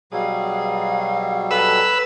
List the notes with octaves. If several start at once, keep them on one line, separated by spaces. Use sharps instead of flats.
B2 F#3 G3 G#4 F5
A4 B4 E6